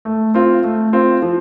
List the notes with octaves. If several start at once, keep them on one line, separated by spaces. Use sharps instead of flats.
A3
C4 F4
A3
C4 F4
F3